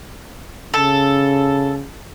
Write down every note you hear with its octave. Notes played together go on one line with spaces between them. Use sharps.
C#3 A4